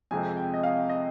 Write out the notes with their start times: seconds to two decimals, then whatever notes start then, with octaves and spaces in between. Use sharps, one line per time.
0.11 F2 C3 F3 G#3 C4 G#5
0.37 G5
0.54 D#5
0.63 F5
0.89 D#5